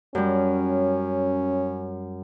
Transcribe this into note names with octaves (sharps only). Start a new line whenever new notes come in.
F#2 G3 C#4